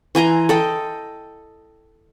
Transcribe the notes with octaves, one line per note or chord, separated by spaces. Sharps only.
E3 G#5 A#5 C6
A4 D#5 G5